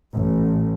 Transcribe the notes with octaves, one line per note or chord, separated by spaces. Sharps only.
A1